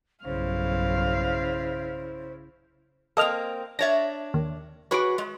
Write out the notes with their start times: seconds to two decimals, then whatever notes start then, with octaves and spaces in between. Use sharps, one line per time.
0.25 B1 G2 C#3 E4 C5 F5
3.17 A#3 C4 A4 D#5 F6
3.79 D4 C#5 E5 A6 A#6
4.34 D#2
4.91 F#4 G#4 B4 C#5 D6
5.18 G#3